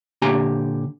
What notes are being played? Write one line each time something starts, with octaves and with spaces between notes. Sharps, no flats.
A#2 D3 G4 G#5 A#5